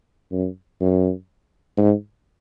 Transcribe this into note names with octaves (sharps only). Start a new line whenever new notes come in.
F#2
F#2
G#2